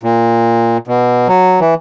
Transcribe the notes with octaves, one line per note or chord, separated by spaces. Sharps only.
A#2
B2
F#3
E3